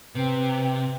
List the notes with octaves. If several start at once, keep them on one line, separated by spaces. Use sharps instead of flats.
C3 C4 B4